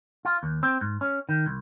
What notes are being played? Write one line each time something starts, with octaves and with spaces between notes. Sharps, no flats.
F4
D#2
C4
G#2
C#4
D#3
C2